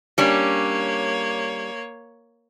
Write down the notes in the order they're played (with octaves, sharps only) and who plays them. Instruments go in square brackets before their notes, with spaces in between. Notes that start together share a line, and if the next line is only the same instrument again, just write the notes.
[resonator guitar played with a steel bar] G3 C#4 D4 [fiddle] A#3 C#5